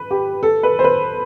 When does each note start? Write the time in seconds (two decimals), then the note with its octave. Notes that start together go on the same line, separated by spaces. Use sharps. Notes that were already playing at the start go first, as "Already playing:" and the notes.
Already playing: B4
0.11 G4
0.43 A4
0.63 B4
0.79 C5
0.84 B4